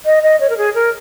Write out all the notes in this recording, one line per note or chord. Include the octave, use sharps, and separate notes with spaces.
D#5
D#5
C#5
A#4
G#4
A#4